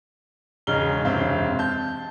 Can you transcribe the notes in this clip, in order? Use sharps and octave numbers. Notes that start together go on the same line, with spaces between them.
E1 C#3 D#4 F6 G7
E1 F#2 C3 C4 F5
A5 G6